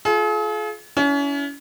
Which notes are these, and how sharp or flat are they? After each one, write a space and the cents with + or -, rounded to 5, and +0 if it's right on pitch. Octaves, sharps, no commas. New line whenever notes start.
F4 +0 G#4 +45
C#4 +35 E4 +0